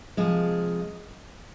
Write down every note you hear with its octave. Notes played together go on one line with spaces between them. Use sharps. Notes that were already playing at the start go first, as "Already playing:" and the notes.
C3 F3 G#3 D#5